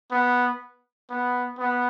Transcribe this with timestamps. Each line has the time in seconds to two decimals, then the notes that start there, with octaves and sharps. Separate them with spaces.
0.11 B3
1.10 B3
1.59 B3